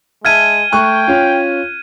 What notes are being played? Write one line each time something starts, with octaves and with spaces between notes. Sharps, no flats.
G#3 E5 A5 F6 G#6 D#7
A3 G5 C#6 F#6
C#4 F4